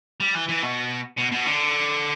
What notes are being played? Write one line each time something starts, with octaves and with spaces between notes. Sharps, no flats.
G3
E3
E3
B2
B2
B2
D3